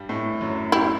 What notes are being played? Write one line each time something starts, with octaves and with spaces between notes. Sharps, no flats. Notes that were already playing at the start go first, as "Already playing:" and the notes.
Already playing: G2 G3
A2 A3
F#2 F#3
E4 G4